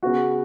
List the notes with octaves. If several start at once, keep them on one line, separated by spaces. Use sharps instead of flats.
C#3 B3 F#4